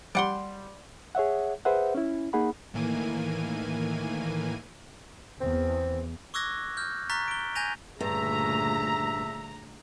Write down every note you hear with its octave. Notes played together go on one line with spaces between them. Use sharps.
G3 D5 F#5 C6
G#4 C#5 E5 F#5
G#4 B4 C5 E5 F#5
C#4 E4
A#3 D#4 G#4 F#5 B5
A2 D#3 E3 A#3 G#5 D#7
E2 C4
C#6 D6 E6 F#6 G#6 A#6
F6 G6
A#5 C#6 F6 F#6 A6 B6
D7 G7
G#5 G6 G#6 A#6 D#7 F7
D2 G2 A#2 C#3 E5 A#5